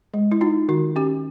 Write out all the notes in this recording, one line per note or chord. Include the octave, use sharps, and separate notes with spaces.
G#3
E4
D#4 F4
D#3 F#4
C#4 G4